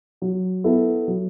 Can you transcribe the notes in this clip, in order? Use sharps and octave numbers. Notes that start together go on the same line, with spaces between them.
F#3
B3 E4 A4
F#3